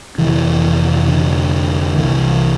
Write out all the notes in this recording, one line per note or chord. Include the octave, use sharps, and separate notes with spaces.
F1 F2 C3 E3
D3
C2 C3 E3